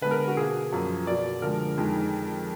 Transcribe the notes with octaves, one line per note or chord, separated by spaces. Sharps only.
D3 G#3 B3 B4
A#4
F#4
B2 A#3 G#4
F#2 F3 A#3
B2 A#3 D5
D3 F3 G#3 A#4
F2 D#3 G#3